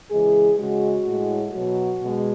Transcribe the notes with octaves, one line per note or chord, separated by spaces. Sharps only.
C#3 E3 G#3 G#4
C#3 G#3 F#4
A2 G#3
B2 F#3 F#4
B2 G#3